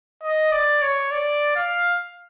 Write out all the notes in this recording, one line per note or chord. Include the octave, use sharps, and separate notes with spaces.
D#5
D5
C#5
D5
F5